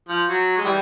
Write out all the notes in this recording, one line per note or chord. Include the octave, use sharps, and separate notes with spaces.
F3
F#3
G#3
E3 G3